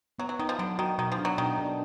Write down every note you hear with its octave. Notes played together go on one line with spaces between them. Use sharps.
F#3 B3
F#3
D#3 D#4
F3
D3 F#3
D#3 F#4
B2 D#3
F3
D4
F#3
B2 D#3
D4